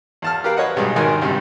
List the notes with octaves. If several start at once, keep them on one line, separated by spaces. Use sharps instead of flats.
E2 A5 F6
G4 A#4 B4 F5
B4 C#5 D#5 F#5
B1 G2 G#3
G#1 D#3 F#4 A#4 G#5 C6
C#2 G2 C3